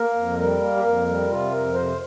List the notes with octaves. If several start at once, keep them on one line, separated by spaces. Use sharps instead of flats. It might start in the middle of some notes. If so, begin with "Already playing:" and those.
Already playing: A#3 A#4
F2
G3 A#4
A#3
G4
F2 A#4
G3
C3 F4
F2 A#4
C3 C5